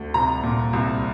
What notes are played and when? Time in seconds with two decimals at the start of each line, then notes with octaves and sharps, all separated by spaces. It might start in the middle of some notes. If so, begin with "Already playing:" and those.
Already playing: D2
0.14 C2 A#5
0.43 A#2
0.73 C2